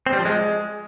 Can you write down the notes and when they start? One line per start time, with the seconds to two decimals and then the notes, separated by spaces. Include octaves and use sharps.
0.06 C4
0.13 G3
0.19 F3
0.25 G#3